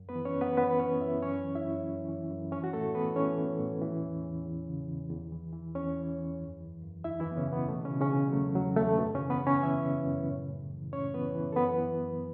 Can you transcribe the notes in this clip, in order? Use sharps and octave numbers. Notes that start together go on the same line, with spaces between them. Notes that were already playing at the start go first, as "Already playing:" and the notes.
Already playing: F#2
B3 B4
E3
C#4 C#5
F#2
B3 B4
E3 B3 B4
E3 C#4 C#5
F#2 E4 E5
F#2 C#4 C#5
E3
E4 E5
F#2
F#2
E3
F#2
E3 C#4 C#5
F#4
A2 A3 A4
E3 B3 B4
E3 C#4 C#5
E3
A2
E3
E2
E2
E2
C#3
E2
E2
E3
E3
E2 C#4 C#5
E3
E2
F#2
E3
F#2
E3 E4 E5
E3 E4
F#2
B3
C#3 C#4
B2 E3 B3
B2 A3
C#3 C#4
B2
C#3 C#4
B2
F#3
E2 A3
E2 F#3
E2 A3
F#2 B2 B3
C#3 C#4
E3
B3 B4
C#3 C#4 C#5
E3 E4 E5
C#3
F#2
A2
A2
E3
A2 C#4 C#5
E3 B3 B4
E3
A4
F#2 B3 B4
E3
F#2